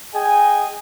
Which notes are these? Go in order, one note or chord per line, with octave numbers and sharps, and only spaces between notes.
G#4 D#5 G5 G#5